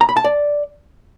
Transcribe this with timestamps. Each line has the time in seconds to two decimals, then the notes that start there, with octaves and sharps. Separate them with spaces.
0.01 A#5
0.09 B5
0.17 A5
0.24 D5